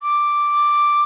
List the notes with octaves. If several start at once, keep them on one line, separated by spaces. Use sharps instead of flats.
D6